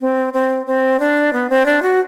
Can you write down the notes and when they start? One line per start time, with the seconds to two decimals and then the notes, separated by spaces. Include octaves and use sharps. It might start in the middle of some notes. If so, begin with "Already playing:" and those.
0.01 C4
0.33 C4
0.67 C4
1.00 D4
1.33 B3
1.50 C4
1.66 D4
1.82 F#4